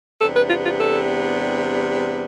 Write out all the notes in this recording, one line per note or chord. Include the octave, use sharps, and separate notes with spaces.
E2 C3 G3 B3 D4 A4
B4
F4
F4
A4